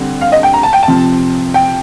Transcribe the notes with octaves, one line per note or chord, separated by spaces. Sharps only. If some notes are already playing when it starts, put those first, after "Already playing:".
Already playing: D3 G3 C4
F5
D#5
G5
A#5
A5
G5
A5
C3 F3 C4
G5